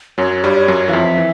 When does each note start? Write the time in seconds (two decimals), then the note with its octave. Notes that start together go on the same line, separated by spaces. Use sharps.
0.18 F#2 F#3 C#5
0.44 G2 G3
0.49 D5
0.56 C#5
0.68 F#2 F#3
0.88 E3 F5
0.92 F2 F3 E5
1.18 E3